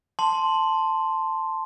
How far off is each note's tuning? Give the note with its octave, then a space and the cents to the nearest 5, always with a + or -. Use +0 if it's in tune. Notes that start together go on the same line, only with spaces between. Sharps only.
A5 +0 C6 +0